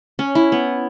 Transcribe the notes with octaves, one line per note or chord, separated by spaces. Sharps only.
C#4
E4
B3